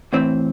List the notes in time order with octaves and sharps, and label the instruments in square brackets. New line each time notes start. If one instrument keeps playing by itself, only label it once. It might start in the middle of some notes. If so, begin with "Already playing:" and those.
[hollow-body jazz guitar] A2 E3 C4